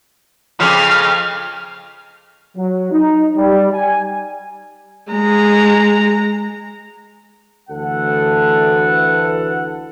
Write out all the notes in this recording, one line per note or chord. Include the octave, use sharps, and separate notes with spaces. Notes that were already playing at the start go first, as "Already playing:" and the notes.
F2 C#3 F3 F6
F#3
D#4
G3
G#5
G#3 A#5
D2 E3 A4 F#5